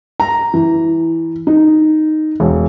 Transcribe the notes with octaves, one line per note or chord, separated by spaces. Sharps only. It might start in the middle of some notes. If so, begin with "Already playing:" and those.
A#5
E3
D#4
E1